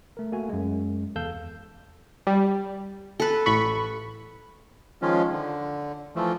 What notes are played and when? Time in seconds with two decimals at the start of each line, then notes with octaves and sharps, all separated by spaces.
0.17 A3 A#4
0.32 A3 A#3 F#4 G#5
0.49 F#2 G#3
1.16 E2 A4 F5 E6 G6
2.27 G3
3.20 A4 B4
3.46 A1 B5 C#6
5.02 D#3 F3 G#3 C#4 F4
5.32 D3
6.16 E3 F3 A3